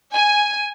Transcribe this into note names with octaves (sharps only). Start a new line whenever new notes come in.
G#5